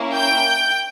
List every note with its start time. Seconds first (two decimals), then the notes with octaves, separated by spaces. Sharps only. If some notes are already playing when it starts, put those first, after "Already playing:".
Already playing: A#3 C#4 E4
0.13 G5 G6